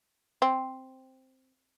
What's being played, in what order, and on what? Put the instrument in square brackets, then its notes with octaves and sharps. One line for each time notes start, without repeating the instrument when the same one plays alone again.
[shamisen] C4